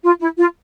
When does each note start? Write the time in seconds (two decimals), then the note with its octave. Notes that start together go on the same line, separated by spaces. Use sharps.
0.04 F4
0.20 E4
0.38 F4